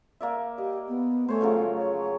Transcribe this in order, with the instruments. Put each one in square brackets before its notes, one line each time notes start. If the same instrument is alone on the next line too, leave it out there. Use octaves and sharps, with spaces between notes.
[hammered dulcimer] A#3 D5 E5
[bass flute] G4 [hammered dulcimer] D#5
[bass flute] B3
[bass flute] A3 [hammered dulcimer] C5 C#5 G#5
[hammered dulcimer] C#3 F3 F#3
[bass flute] C#5